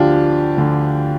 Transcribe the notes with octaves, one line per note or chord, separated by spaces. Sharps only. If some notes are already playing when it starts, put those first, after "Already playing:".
Already playing: D2 D3 F3 D4 F4 G4
D2 D3 F3